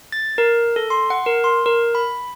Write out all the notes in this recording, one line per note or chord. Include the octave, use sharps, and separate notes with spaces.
A6
A#4
A4
C6
F#5
A#4
C6
A#4
B5